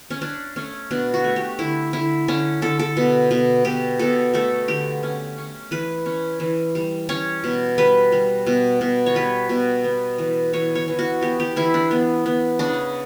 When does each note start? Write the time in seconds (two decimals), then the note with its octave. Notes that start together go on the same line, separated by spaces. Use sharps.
0.10 C#4
0.21 C#4 D4
0.56 A3 C#4
0.91 B2 D4
1.14 F#4
1.24 A3
1.36 G4
1.59 D3 E4
1.93 D3 E4
2.28 D3 C#4
2.62 D3 A4
2.79 A4
2.97 B2
3.31 B2
3.65 B2 G4
3.99 B2 A4
4.34 A3 A4
4.68 D3 G4
5.03 C#4
5.38 C#4
5.71 E3 B4
6.06 C#4
6.40 E3
6.75 G3
7.09 C#4 C#5
7.44 B2
7.78 G3 B4
8.12 G3
8.46 B2
8.81 B2
9.06 C#5
9.15 G3 B4
9.49 B2
9.84 B3
10.18 E3
10.53 E3 C#5
10.75 C#5
10.88 E3
10.99 F#4
11.21 B3 G4
11.40 G4
11.56 E3 E4
11.74 D4
11.91 B3
12.26 B3
12.59 C#3 D4